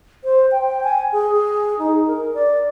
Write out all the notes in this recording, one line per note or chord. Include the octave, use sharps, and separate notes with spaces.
C5
G5
G#5
G#4
D#4
A#4
D5